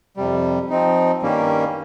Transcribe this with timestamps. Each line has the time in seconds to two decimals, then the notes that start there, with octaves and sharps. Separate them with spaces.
0.17 F2 C3 G3
0.70 F3 C4 D#4
1.22 G2 D#3 G3 A#3 C#4